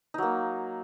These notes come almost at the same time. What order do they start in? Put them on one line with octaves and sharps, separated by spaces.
D#4 F#3 A#3